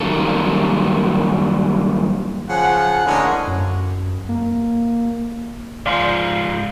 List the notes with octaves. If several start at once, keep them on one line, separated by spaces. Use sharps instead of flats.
F#2 A#2 D#3 G3 A#3 A4
C#3 F3 F#5
A2 D3 G#3 A#3 C#4
F#2
A#3
G#2 F3 D5 F5 C6